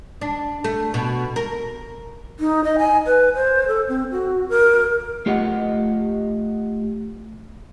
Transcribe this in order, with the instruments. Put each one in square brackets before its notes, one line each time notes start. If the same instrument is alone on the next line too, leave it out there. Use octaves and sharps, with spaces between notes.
[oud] D4
A3
B2
A#4
[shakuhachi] D#4
D#5
G#5
B4
C5
A4
C4
F#4
A#4
[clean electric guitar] A3 F4 G4 C#5 D#5 F#5